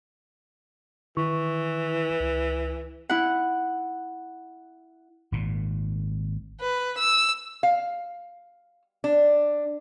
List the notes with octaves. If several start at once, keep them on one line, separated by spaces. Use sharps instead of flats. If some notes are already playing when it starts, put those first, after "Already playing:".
D#3 E3 E4 C#6
C#2
E4 F#5
G#1 A#2
B4
E6
F5
D4